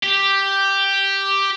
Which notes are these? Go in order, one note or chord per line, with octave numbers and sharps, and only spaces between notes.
G4